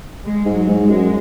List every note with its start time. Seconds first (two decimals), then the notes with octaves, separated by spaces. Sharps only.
0.23 G#3
0.45 G#2
0.53 F#3
0.68 G#2
0.82 G#3
0.90 F#2